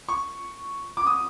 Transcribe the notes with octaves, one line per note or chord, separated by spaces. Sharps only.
C#6
D6
D#6